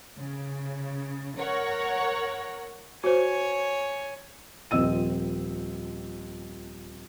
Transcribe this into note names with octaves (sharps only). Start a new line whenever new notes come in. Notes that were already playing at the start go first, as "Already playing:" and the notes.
C#3
A#4 C#5 F#5
F#4 C5 C#5 G#5
D#1 F3 C4 D#5 E6 D#7